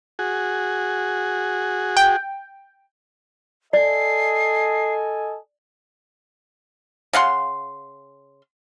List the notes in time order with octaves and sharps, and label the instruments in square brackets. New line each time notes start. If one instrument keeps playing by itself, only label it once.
[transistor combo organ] F#4 G#4
[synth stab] G5
[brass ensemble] A4 D#5 G#5 [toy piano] D5 [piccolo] C7
[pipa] C#3 F5 F#5 C6